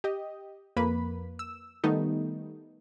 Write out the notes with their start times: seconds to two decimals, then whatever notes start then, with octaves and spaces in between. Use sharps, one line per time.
0.04 G4 D#5
0.76 F2 A#3 B4 B5
1.39 E6
1.84 D#3 G3 A3 B3 D#4